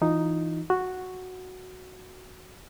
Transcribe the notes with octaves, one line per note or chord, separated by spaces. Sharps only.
E3 D#4 F4
F#4